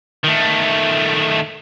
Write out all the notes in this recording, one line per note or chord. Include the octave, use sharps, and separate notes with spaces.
D#3 A3